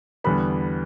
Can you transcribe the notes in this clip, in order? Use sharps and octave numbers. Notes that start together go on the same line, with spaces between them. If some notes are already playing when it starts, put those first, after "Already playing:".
E2 D3 G3 B3 B5